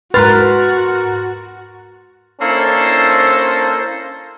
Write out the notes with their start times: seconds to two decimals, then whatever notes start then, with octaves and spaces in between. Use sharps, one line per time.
0.14 G#2 F#4 A#4 B4 C6 F6 A6
2.41 A#3 C#4 D4 E4 A4 C5